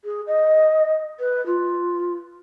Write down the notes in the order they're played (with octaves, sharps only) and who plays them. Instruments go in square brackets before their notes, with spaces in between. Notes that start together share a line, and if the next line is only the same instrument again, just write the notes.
[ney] G#4
D#5
B4
F4